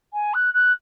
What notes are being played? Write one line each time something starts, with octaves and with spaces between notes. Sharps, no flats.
G#5
F#6
F#6